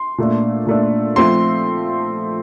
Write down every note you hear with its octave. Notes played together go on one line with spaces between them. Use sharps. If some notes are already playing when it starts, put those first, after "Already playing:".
Already playing: C6
A#2 A3 D4
A#2 A3 D4
F3 A3 C4 C6